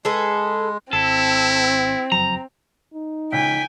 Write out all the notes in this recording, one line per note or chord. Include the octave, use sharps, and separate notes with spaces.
G#3 G#4 A4 B4
G#1 C4 E4 A4
F#1 F2 F#3 A#5
D#4
C#2 G5 G#5 B6